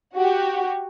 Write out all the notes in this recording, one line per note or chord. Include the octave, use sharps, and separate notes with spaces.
F#4 G4